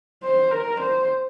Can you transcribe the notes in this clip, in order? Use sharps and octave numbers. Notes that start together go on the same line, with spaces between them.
C5
A#4
C5